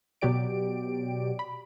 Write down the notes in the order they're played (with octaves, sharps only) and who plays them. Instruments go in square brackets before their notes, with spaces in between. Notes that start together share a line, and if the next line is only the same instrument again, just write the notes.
[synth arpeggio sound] B2 F#3 G4 D5 D7
B5